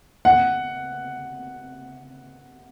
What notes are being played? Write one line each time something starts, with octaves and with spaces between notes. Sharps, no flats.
F#5